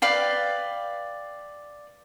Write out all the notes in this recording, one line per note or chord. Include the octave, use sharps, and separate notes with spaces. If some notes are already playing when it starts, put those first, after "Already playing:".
B4 D5 F5 G5